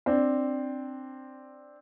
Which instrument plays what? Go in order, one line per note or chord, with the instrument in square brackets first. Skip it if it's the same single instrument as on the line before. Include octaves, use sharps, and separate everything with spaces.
[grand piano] C4 D4